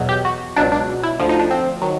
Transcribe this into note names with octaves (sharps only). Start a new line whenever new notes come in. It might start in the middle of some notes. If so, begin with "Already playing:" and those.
Already playing: E2 B2 F#3
G4
F#4
C#2 B2 F#3 D4
D4
E4
D2 D3 F3
D#4
D4
C4
D#3 F#3